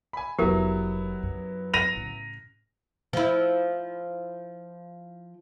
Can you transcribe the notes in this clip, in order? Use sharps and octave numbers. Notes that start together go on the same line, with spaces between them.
G#5 B5
F1 F#3 G3 B3 E4 G4 A#4
F#2
A#6 D#7 F7
A2 C#3
F3 E4